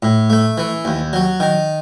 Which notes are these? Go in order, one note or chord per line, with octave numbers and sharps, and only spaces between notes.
A2
A3
E3
D#2
F#3
D#3